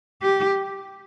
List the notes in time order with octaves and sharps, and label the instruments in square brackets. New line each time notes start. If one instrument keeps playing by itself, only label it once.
[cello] G4